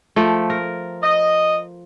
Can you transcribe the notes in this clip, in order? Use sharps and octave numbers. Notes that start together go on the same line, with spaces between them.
F3 A3
A#4
D#5